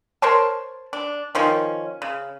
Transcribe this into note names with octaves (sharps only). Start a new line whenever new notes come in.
A#4 C5 C#5 A5
D4
D#3 F3 C#4
C#3